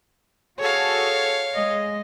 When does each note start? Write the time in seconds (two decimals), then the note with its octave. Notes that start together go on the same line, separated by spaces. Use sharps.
0.59 F#4 G#4 A4 C#5 F5
1.55 G#3 D#5